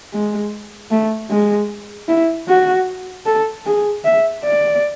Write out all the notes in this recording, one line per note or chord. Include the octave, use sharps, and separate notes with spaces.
G#3
A3
G#3
E4
F#4
A4
G#4
E5
D5